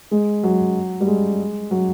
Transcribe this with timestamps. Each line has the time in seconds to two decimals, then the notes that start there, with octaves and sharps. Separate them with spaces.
0.11 G#3
0.43 F#3
1.00 G3
1.07 G#3
1.71 F#3